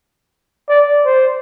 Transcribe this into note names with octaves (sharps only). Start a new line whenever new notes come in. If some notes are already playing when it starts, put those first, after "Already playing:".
D5
C5